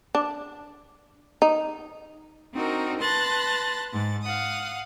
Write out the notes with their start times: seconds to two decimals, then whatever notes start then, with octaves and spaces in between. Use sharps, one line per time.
0.15 D4
1.42 D#4
2.53 C4 D4 D#4 F#4 A#4
2.99 B4 A5 C6 F#6 A6 A#6
3.92 G#2 A6
4.23 F5 F#5 D#6